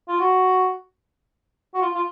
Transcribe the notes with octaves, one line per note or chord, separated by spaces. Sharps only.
F4
F#4
F#4
F4
F4